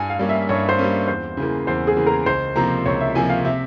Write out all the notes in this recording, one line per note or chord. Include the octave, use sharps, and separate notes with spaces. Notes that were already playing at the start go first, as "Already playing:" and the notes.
Already playing: G2 G#5
F5
G3 A#3 C#4
E5
G2 C#5
C5
G3 A#3 C#4
E2 C5
C#3 E3 A#3
E2 C5
G#4
C#3 E3 A#3
A#4
C#2 C5
C3 F3 A#3 A#5
C#2 C#5
E5
C3 F3 A#3 G#5
F5
C3 E5